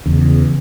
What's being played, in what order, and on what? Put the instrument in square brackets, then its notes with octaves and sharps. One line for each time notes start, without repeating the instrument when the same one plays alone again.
[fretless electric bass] E2 [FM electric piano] C#3